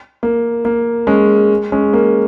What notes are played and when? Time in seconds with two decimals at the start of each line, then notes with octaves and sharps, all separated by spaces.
0.23 A#3
0.65 A#3
1.07 G#3 C#4
1.72 G#3 C#4
1.93 A#3